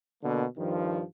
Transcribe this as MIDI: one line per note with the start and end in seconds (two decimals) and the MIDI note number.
0.22 0.45 47
0.22 0.45 50
0.22 0.45 58
0.57 1.03 43
0.57 1.03 51
0.57 1.03 53